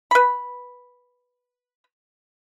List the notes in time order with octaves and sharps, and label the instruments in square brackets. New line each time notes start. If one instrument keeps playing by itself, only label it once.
[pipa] B4 B5